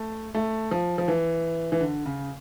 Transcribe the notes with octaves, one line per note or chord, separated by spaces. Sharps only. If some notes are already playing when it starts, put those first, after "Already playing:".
Already playing: A3
A3
F3
F3
E3
E3
D3
C#3